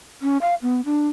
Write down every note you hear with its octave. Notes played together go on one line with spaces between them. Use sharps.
C#4
F5
B3
D4